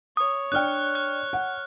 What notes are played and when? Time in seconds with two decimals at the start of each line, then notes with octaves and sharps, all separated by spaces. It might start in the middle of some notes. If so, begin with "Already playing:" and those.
0.17 C#5 D#6
0.52 D4 D5 G5 F6 F#6
0.95 F#6
1.33 F#5